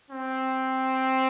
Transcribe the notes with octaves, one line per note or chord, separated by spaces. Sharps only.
C4